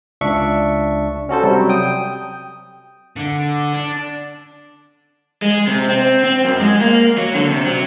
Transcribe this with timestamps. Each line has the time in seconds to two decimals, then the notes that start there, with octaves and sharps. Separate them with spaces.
0.21 C#2 D4 E5 C#6
1.29 C#4 F#4 A4 C5
1.43 C3 F#3 G3
1.69 G5 D#6
3.17 D3
3.73 D4
5.42 G#3
5.67 C3
5.89 C4
6.24 C4
6.45 F#2
6.59 G#3
6.81 A#3
7.18 F#3
7.34 D3
7.50 C3
7.66 F#3